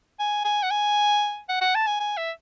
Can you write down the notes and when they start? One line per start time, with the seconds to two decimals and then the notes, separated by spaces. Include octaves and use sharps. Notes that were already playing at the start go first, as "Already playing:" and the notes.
0.19 G#5
0.45 G#5
0.63 F#5
0.71 G#5
1.49 F#5
1.62 F#5
1.75 A5
1.87 G#5
2.00 G#5
2.17 E5